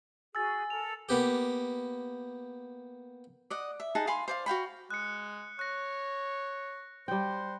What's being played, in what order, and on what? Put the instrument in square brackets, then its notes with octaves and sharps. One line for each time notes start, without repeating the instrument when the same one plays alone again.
[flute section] F#4 G#4 [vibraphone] G#5 [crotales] E6 A6
[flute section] A4 A#4 [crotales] F7
[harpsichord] A#3 B3 G4
[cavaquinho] D5 D#5 F#5
E5
D#4 G#4 F#5 A5
F5 G#5 B5 C6
C5 D5 F5
F#4 F5 G5 B5
[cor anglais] G#3 [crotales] F#6 C#7
[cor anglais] C#5 [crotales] F#6 A#6
[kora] G3 G5 [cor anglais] C5